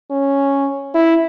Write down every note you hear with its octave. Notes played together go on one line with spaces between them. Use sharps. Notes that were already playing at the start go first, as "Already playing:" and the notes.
C#4
E4